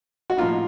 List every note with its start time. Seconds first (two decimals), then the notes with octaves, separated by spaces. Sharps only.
0.30 F#4
0.37 A2 F3 A#3 D#4 F4